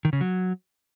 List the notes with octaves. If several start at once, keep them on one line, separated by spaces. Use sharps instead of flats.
D#3
C#3
F#3